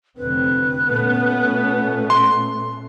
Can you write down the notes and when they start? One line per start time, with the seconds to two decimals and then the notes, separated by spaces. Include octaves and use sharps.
0.17 F1 D3 C4 B4
0.87 A#2 A3 B3 C#4
2.10 C6